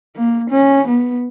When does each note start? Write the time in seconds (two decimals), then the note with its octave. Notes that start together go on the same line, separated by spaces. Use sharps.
0.16 A#3
0.50 C#4
0.87 B3